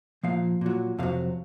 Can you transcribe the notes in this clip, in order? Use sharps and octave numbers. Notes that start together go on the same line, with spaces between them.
A#2 F3 F5
A#2 F#3
F2 C3 F#3 F5